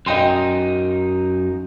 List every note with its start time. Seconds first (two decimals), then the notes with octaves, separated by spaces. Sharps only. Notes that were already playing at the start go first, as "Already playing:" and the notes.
0.06 F#2 D#4 D#5 G5 C6